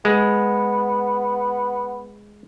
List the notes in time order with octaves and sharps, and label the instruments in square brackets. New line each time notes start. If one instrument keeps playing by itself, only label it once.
[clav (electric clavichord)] G#3 [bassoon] B3